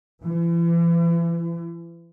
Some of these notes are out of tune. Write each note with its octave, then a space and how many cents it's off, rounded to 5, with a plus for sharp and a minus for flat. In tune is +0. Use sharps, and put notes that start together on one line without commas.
E3 +40